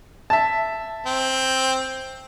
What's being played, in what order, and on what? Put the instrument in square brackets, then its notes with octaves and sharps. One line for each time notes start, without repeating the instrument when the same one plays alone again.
[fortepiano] E5 A5
[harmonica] C4